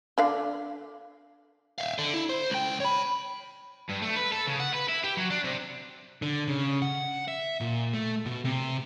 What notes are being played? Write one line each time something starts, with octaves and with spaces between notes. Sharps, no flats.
D3 D5 F5
E5 F5
D3
E4
C5
C#2 G5
C#5 B5
G2
A3
B4
A4
C#3
F#5
B4
E4
G4
F#3
D4
C3
D3
C#3
F#5
E5
A#2
A3
B2
C3